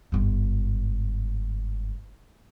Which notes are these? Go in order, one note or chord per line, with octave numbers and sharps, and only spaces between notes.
G1 G#2